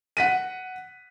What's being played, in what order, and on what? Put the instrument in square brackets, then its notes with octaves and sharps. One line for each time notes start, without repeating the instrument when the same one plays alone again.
[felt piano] F#5 B6 D#7